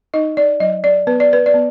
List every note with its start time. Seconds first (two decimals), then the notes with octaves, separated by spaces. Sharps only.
0.14 D#4 D#5
0.37 D5
0.60 F#3 D#5
0.84 D5
1.07 B3 B4
1.20 D5
1.33 B4
1.46 D5
1.54 B3